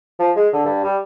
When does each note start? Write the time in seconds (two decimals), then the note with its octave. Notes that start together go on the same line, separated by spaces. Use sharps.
0.19 F3
0.36 G#3
0.53 D3
0.65 G2
0.84 G3